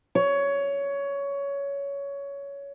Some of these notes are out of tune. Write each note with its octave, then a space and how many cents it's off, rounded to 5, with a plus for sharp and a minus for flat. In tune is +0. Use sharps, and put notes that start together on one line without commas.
C#5 +15